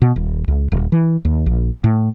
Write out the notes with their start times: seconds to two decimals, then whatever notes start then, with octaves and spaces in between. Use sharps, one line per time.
0.02 B2
0.16 D#1
0.48 C#2
0.72 D#1
0.92 E3
1.25 D#2
1.46 A#1
1.84 A2